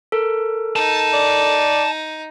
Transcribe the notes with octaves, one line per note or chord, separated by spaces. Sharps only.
A4 A#4
D#4 A5
D5